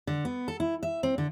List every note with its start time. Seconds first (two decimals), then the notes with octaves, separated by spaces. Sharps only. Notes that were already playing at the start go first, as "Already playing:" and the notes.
0.07 D3
0.25 B3
0.48 A4
0.60 E4
0.83 E5
1.03 C4
1.18 D3